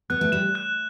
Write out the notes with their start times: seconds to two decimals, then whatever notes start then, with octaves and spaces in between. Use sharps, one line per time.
0.10 B3 F#6
0.21 A3
0.32 G3 E7
0.55 F#6